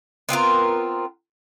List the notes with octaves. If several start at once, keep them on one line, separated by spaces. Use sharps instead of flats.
B3 C4 F4 A#4